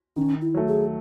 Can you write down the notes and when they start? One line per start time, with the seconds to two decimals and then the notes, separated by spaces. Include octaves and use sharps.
0.16 D#3 C#4
0.41 E4
0.54 F#3 A3
0.67 G#4